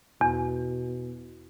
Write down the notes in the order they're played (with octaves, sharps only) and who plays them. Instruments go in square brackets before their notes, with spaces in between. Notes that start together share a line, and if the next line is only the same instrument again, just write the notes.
[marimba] E2 [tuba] B2